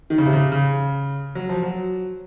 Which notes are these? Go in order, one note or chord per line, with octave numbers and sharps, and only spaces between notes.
D#3
C#3
C3
C#3
C#3
F#3
F3
F#3